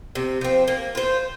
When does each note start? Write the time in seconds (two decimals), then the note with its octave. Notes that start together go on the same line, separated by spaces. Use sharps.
0.15 C3
0.41 F3 C4
0.68 A#3
0.95 F4 C5